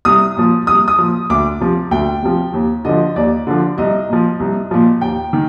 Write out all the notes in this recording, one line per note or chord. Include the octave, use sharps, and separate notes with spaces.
C2 D#6
A#2 F3
C2 D#6
D#6
A#2 F3
D2 D6
C3 F3
D2 G5
C3 F3
D#2
D3 F3 D#5
D#2 D5
D3 F3
C2 D#5
A#2 F3
C2
A#2 F3
D#2 G5
D#3